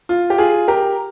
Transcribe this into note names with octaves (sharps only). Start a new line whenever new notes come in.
F4
G4
F4 G#4
G4 A#4